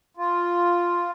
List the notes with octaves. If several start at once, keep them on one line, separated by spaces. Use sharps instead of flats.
F4